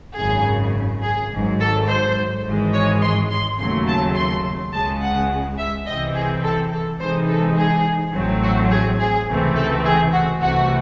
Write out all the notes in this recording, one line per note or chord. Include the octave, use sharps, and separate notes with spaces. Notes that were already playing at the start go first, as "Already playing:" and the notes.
G#1 F#2 C#3 G#4
G#4
G#1 G#2 F#3
A4
C5
G#1 G#2 E3 G#3
C#5
C6
C6
D#2 C#3 F#3 A3 C6
A5
C6
C#2 C#3 G#3 A5
F#5
E5
C2 C3 E3 C4 D#5
G#4
A4
A4
C3 E3 G#3 D#4 C5
A4
G#4
A1 A2 F#3 A3 C4
F#4
G#4
G#4
C#2 C3 E3 A3 C4
A4
G#4
F#4
C2 C3 E3 A3 F#4